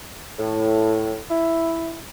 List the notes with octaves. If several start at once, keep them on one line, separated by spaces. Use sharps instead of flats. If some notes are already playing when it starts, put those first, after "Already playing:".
A2
E4